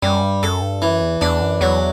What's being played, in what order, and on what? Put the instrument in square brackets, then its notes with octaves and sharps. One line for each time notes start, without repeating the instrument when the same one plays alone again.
[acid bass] F#2 [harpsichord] G3
[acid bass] G2
[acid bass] F#2 [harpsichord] A4
[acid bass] G2
[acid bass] F#2 [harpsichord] E3
[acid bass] E2
[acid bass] E2 [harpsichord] D4
[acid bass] F#2
[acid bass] E2 [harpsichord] F#3